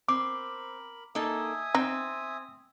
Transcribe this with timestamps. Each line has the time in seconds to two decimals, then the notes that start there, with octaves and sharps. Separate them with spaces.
0.08 C4 A#4 B5 D6
1.15 A#3 D#4 A4 E5 G#5 D#6
1.75 C4 D#4